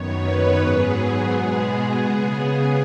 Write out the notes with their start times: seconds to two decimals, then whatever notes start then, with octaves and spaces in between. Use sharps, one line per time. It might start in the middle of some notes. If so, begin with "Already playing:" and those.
Already playing: F#2 D#3 B3 C#5
0.21 B4
0.56 G#2 F#3 B3 G#4
1.28 B2 G#3 B3
1.99 C#3 B3 G#4